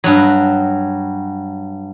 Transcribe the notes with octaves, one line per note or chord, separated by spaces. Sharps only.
G2 F#3